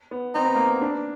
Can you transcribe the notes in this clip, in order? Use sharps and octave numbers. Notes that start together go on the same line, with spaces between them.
B3
C4 D#4
B3
A#3
B3
D4